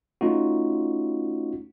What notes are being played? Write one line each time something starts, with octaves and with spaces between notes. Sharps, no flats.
A3 C#4 D#4 F4 F#4